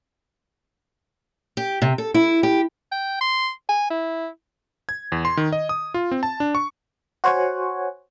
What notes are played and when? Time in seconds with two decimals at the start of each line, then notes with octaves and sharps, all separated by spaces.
1.57 G4
1.82 C3
1.98 A4
2.14 E4
2.43 G4
2.92 G5
3.21 C6
3.69 G#5
3.90 E4
4.89 G#6
5.12 E2
5.25 C6
5.37 D#3
5.53 D#5
5.69 D#6
5.94 F4
6.11 C4
6.23 A5
6.40 D4
6.55 C#6
7.24 F#4 C5 C#5 F#5 G#5